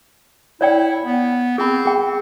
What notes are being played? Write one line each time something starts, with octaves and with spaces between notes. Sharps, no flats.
E4 C#5 D5 G5
B3
C4 G#4 B5
G#4 G5